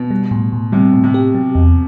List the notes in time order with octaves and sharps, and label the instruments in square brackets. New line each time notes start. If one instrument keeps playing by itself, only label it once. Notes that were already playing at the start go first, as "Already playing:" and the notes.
Already playing: [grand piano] B2 [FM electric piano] B3
[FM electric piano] G3
A2
A2
[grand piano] C3 [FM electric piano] G3
[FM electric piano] A2
[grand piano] C3
[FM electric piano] G4
F#3
E2